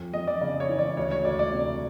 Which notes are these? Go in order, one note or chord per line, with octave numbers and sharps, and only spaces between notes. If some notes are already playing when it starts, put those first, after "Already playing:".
Already playing: F2
F2 D#5
D5
C#3 D5
C#5
E3
D5
D2 C#5
C#5
D2 D5
D5
C3